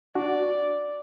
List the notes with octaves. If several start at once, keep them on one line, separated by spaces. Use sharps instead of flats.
D4 F#4 D5